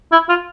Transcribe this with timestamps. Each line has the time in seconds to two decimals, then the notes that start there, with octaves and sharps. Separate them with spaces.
0.12 E4
0.29 F4